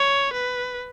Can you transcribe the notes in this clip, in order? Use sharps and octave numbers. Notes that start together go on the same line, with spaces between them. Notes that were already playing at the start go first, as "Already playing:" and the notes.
Already playing: C#5
B4